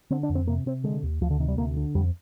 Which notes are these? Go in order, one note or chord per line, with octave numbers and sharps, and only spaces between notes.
D3 C4
D4
F2
C4
C3 A#3
C3 C4
D3 G#3
D#2
D2 F3
D3
C3 D#3
G3
D2 A#3
D3
F2 G3